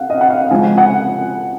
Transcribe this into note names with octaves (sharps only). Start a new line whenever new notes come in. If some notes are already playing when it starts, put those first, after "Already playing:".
Already playing: F5 F#5
D#5
F#5
F5
C#3 F3 G#3 G#5
F#5